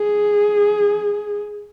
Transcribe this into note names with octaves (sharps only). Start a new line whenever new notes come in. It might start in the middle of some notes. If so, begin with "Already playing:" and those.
Already playing: G#4